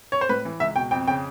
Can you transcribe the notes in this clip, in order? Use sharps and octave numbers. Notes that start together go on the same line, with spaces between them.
C#5
C5
A2 B4
E3
C#2 E5
B2 G5
F2 G5
C#3 G5